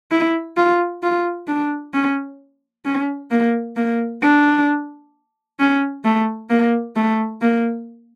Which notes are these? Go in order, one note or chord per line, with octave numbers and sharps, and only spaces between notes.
E4
F4
F4
D4
C#4
C#4
A#3
A#3
D4
C#4
A3
A#3
A3
A#3